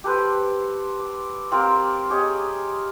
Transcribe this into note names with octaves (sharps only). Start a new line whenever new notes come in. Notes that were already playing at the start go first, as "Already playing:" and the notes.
G4 A4 B4 C5
D6
C4 F4 G4 A#4
G4 G#4 C#5 D#5